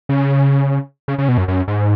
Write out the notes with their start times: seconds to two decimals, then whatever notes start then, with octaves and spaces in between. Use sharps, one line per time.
0.09 C#3
1.08 C#3
1.18 C#3
1.28 B2
1.38 F#2
1.48 F#2
1.68 G#2